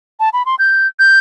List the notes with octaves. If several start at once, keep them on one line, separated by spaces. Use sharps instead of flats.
A5
B5
C6
G6
G6